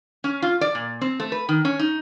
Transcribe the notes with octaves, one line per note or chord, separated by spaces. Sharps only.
C#4
F4
D5
A#2
C4
A3
B4
D#3
C#4
D#4